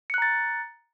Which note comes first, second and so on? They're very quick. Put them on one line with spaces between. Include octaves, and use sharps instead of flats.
C#7 F#6 A#5 A6